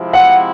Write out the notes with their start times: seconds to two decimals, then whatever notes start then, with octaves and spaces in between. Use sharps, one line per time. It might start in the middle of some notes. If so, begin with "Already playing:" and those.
Already playing: C3 F3 G#3 C4 E4
0.13 F#5